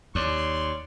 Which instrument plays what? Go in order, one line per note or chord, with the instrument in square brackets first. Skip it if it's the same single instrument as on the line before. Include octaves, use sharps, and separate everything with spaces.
[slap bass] D#2 [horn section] C#5 D5 C6